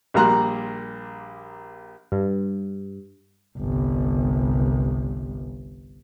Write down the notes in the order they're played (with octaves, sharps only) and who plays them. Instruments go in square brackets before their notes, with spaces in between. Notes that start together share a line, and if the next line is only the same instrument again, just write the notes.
[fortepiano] A#1 G3 A#3 A#5 C6 F#6
[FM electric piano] G2
[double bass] G1 C2